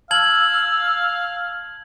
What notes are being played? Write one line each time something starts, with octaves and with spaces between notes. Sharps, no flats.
F5 A5 E6 G#6 F#7